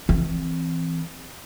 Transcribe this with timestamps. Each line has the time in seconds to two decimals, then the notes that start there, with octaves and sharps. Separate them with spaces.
0.09 E3 C4